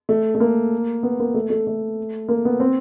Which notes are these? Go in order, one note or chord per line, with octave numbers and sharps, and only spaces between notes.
A3
A3
A#3
B3
A#3
A3
A3
A3
A#3
B3
C4